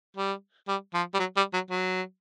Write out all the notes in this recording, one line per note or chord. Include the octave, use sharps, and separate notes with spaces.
G3
G3
F3
G3
F#3
G3
F#3
F#3